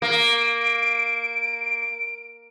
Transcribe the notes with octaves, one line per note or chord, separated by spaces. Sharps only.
A#3 D7